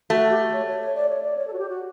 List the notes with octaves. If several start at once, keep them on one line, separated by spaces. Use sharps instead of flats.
A3 F#4
G4
C#5
C#5
C#5
D5
C#5
D5
C#5
A4
F#4
G4
F#4